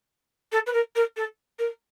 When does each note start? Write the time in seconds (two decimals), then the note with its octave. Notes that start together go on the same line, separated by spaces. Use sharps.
0.52 A4
0.67 B4
0.73 A#4
0.96 A#4
1.17 A4
1.59 A#4